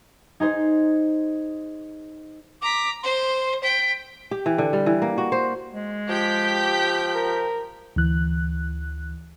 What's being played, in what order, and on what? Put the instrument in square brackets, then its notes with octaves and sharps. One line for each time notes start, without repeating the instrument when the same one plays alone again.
[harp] D#4 G#4 C5
[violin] A#5 B6 [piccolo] D6
[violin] C5 [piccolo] C6
[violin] G5 [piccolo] B6
[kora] G4
E3
D3
G3
E3
A#3
F#4
C5
[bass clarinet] G#3
[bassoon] F3 [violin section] G4 G6 B6
[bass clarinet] A#4
[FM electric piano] D2 E3 F#6